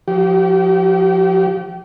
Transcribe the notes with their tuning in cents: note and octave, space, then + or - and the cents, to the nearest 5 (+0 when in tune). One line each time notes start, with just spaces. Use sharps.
F3 +20 G4 -35